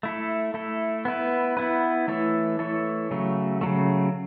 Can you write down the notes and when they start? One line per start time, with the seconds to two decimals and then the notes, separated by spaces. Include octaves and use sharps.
0.03 A3 E4 A4
0.54 A3 E4 A4
1.05 B3 E4 B4
1.57 B3 E4 B4
2.08 E3 A3 E4 A4 C#5
2.59 E3 A3 E4 A4 C#5
3.11 C#3 F#3 A3
3.61 C#3 F#3 A3